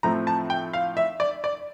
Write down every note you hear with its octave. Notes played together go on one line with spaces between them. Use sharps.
A2 F3 A3 C4 A#5
A5
G5
F5
E5
D5
D5